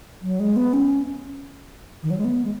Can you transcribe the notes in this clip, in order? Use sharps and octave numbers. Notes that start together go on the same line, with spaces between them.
F#3
G#3
B3
C#4
D#3
F#3
G#3
B3
G#3